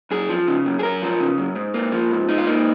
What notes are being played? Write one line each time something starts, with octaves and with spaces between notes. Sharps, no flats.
F#2 G#4
F3
C#3
F#2
G#4
F#2 A#4
F3
C#3
F#2
G#2
A#3
F3
G#2
G#2 D#4
F4
A#3 D#4